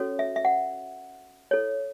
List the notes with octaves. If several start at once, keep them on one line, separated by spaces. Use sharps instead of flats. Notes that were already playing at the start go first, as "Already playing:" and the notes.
Already playing: C#4 F#4 A4 C#5
E5
E5
F#5
E4 A4 C#5